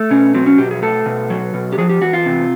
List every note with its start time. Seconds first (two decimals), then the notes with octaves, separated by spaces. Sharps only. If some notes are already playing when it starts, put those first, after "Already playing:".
Already playing: A3
0.11 B2 C#4
0.34 F#3 C4
0.46 C#4
0.58 B2 G4
0.71 G#4
0.82 A3 A4
1.06 B2
1.30 F#3
1.54 B2
1.72 G4
1.78 F3 G#4
1.89 G4
2.01 E2 F#4
2.13 F4
2.26 C3